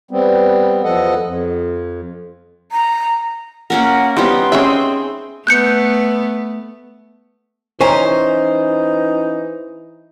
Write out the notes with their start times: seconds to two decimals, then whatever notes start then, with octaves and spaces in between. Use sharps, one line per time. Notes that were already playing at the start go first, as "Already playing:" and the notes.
0.11 G3 B3 C4
0.84 E2 F3 B3 A4 D#5 F#5
1.22 F2
2.71 A#5
3.70 A#3 C#4 A#4 F#5
4.17 E3 G3 B3 C4 D#4 G4 C6
4.52 C4 C#4 G#4 B4 E5 G5
5.47 A3 B3 F#6 G6 C#7
7.81 E3 C#4 D#4 C5 G#5 A#5